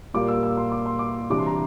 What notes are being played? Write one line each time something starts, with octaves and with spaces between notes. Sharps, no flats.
A#2 G3 A#3 F4 D6
E6
E6
C6
D6
C6
D6
C3 E3 G3 D4 D6
C6
A#5